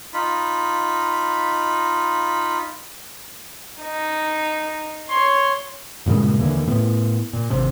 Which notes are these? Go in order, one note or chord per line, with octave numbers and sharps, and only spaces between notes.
D#4 F4 B5
D#4
C#5 C6
G2 A#2 C#3 G#3
D#2 D3 E3 A#3
A2 B3
A#2
G#1 C3